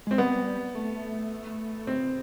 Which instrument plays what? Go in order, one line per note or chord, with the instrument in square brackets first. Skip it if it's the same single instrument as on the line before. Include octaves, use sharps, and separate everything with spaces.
[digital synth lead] G#3 [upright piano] C4
[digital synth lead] G3 [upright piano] B3
[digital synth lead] A3
[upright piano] C4